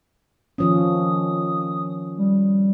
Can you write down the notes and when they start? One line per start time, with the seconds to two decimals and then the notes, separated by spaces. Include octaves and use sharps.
0.58 D#3 F3 C#4 D#6
2.18 G3